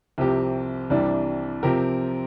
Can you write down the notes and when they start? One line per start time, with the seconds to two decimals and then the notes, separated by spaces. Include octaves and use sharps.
0.18 C2 C3 F3 C4 G4
0.90 C2 C3 E3 G3 D4
1.63 C3 F3 C4 G4 A#4